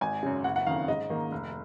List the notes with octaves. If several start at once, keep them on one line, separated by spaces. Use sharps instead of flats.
G#1 G#5
F#2 C#3
F#1 F#5
F#5
F2 D#3 F5
G#2 D#5
D#3 A#3
F1